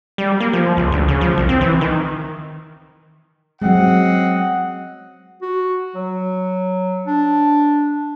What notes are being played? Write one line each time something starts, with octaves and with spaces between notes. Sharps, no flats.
G3
A#3
F3
C#2
D2
C#3
F3
C2
C4
E3
D#3
F#3 G#3 C4 D#5 F#5
F#4
F#3
D4